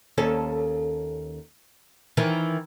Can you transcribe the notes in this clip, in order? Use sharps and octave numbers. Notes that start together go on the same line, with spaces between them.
D#2 C#4 A4
D#3 E3